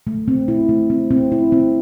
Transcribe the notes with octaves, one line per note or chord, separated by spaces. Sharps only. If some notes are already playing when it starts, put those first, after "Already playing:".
A3
C4
E4
A3
C4
C4
E4
C4